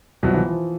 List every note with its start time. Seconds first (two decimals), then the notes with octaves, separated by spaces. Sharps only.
0.23 C2 B2 F3 F#3
0.34 E3
0.47 F3